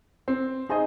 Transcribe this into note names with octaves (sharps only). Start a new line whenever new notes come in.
C4
D#4 G#4 C5 D#5